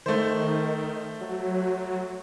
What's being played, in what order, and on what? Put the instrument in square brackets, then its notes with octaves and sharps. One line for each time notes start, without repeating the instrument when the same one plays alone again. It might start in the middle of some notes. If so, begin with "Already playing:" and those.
[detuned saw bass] D#3 [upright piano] A3 C5
[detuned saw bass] F#3